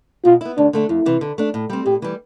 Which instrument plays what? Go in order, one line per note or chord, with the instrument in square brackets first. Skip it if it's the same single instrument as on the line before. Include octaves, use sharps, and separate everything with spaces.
[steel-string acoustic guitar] B2 [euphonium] F4
[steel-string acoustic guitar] B3 E4
[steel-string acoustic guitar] D2 [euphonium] D4
[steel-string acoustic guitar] D3 A3 D4
[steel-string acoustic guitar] F2 [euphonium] E4
[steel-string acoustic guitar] C3 E3
D3
A3 D4
A2
G3 C4
[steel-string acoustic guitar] A2 [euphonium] G4
[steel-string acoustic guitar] E3 G3